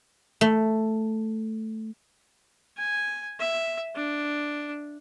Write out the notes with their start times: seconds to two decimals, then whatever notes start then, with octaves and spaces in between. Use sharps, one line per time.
0.41 A3
2.77 G#5
3.39 E5
3.95 D4